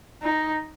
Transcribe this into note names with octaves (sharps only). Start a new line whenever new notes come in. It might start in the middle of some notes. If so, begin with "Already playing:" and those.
D#4